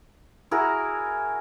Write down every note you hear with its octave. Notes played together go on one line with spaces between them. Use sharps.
E4 F#4 G#4 A#4